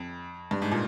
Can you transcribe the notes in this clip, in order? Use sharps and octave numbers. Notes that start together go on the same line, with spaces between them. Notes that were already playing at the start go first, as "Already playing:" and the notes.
Already playing: F2
G2
G#2
A#2